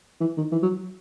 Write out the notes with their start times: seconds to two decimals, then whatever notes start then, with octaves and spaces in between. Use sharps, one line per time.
0.21 E3
0.37 D#3
0.52 E3
0.63 F#3